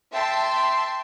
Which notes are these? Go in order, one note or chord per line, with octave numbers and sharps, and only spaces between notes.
E5 G5 A5 C6 E6